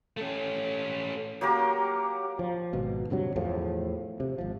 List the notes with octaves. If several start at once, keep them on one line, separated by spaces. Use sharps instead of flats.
A3 C#4
F#3 A#3 G4 A#4
F3
G#1 B2
D1 G2 C3 F#3
E2 A2 F3
C3
G#1 F3